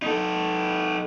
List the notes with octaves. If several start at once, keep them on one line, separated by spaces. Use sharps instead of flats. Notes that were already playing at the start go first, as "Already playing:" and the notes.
D#4 A4